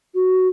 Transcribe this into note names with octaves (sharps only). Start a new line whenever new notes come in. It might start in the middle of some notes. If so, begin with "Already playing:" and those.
F#4